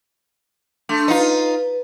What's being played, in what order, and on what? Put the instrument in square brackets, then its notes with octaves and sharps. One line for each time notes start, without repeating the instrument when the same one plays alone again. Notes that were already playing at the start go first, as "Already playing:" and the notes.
[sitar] A3 [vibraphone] D4 C6
[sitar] D#4 F4 [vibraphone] B4